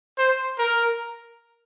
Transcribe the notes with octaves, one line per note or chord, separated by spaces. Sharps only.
C5
A#4